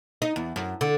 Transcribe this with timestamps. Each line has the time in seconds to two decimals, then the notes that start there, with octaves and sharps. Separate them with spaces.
0.22 D#4
0.36 E2
0.56 F#2
0.81 D3